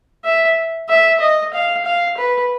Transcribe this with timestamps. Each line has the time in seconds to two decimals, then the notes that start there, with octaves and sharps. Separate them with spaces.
0.24 E5
0.89 E5
1.20 D#5
1.54 F5
1.86 F5
2.18 B4